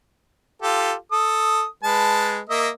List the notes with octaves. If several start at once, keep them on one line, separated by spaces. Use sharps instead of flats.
F4 G4 A4
A4 D#6
G#3 B4 A5
A#3 D#5 E5